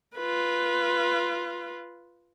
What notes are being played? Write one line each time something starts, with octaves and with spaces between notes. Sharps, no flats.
F4 B4